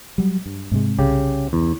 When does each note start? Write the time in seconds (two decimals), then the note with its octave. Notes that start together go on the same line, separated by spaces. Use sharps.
0.18 F#3 G3
0.46 G2
0.72 G#2 C3 G#3
0.99 C2 C#3 G4
1.53 E2